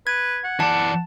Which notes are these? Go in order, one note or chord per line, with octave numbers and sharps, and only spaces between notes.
B4 G#6
F#5
E3 D5 A5